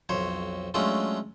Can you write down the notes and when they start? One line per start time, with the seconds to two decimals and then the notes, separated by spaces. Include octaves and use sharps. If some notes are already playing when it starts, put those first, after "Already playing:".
0.09 B1 F2 C5 C#5
0.74 F#3 G#3 A3 C#4 D4 F4